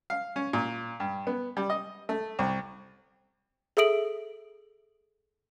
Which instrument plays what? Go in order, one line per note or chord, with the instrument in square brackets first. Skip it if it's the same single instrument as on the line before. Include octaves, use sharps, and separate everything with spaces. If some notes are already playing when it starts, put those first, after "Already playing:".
[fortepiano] F5
C#4
A#2
G2
B3
G3
D#5
A3
C2
[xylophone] G#4 A4 E5 D#6 D7 F#7